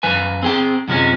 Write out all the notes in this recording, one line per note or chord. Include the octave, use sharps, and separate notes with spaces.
F#2 F3 B4 G#5
C4 G#4 G5
F#2 C3 F3 G#3 C#4